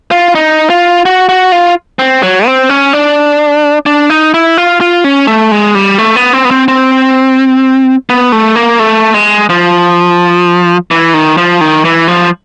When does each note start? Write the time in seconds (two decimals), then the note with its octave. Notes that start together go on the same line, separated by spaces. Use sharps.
0.11 F4
0.35 D#4
0.70 F4
1.05 F#4
1.29 F#4
1.52 F4
1.99 C4
2.23 F#3
2.46 C4
2.69 C#4
2.93 D4
3.86 D4
4.10 D#4
4.34 E4
4.57 F4
4.81 F4
5.04 C#4
5.27 A3
5.51 G#3
5.75 G3
5.98 A3
6.16 B3
6.33 C4
6.45 B3
6.51 C4
6.68 C4
8.10 B3
8.32 A3
8.56 A#3
8.79 A3
9.14 G#3
9.49 F3
10.91 E3
11.14 D#3
11.38 F3
11.61 D#3
11.85 E3
12.08 F3